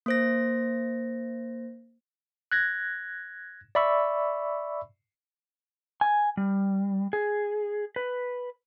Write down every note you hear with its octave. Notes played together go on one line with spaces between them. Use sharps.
A#3 C5 A#6
F#6 G#6 A#6
D5 E5 B5 C#6 E6
G#5
G3
G#4
B4